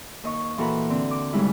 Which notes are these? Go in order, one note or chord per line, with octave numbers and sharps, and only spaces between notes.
D#2 D#5 C#6
A#2 E3 F#4 A4 A#5 B5
D3 C4
D6
G#2 C#3 G3 G#3 E4